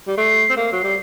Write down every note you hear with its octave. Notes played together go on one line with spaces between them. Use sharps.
G3
A3 C7
C4
A#3 C7
F#3
G3